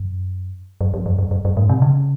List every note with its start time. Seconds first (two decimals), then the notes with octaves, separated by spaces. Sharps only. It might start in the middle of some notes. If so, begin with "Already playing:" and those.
Already playing: F#2
0.81 F#2
0.94 F2
1.06 F#2
1.19 F#2
1.31 F#2
1.45 F#2
1.57 G#2
1.69 C3
1.82 C#3